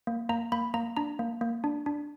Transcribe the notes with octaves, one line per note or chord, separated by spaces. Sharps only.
A#3
A#3 A#5
A#3 B5
A#3 A#5
D4 A#5
A#3
A#3
D4
D4